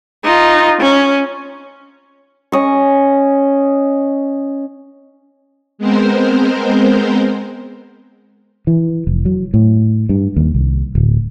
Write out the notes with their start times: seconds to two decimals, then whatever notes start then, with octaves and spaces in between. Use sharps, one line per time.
0.24 D#4 F4
0.81 C#4
2.52 C#4 D#5 C#6
5.78 G#3 B3 C4 A#4 C5
8.67 E3
9.07 F1
9.25 F#3
9.54 A2
10.09 G2
10.36 D#2
10.55 C2
10.95 D1